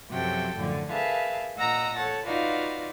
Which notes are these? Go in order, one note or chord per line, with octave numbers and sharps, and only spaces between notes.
F#2 C3 F3 F#3 A4 G5
F#2 A2 D3 F3
G#4 A#4 B4 E5 F5 A5
A#2 D#5 F#5 A#5 E6 A#6
A4 C#5 F#5 A5
D#4 F4 F#4 B4 D5 F5